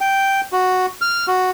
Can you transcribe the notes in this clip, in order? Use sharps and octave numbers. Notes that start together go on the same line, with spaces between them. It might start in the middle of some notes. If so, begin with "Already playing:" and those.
G5
F#4
F6
F#4